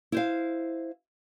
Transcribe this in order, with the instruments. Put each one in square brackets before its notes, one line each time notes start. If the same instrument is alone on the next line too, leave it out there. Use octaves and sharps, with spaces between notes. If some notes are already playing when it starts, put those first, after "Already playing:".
[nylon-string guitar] E4 C5 F5